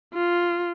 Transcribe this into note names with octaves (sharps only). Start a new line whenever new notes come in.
F4